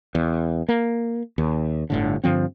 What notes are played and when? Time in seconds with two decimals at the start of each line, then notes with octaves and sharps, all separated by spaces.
0.15 E2
0.69 A#3
1.38 D#2
1.90 G1 A2 D3
2.24 G2 D3 F3 C4